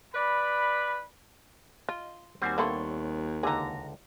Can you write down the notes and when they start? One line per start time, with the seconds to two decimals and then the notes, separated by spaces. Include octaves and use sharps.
0.14 B4 D5 B5
1.89 F4 D#5 C6
2.42 D#2 G3 C4 F#4 C5 G#5
2.58 A#3 B3 E4 A4 C#5 C6
3.43 C#2 D3 D#4 F#4 G#4 A#5